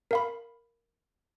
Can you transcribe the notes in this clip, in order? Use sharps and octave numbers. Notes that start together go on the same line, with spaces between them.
A#4 F5 B5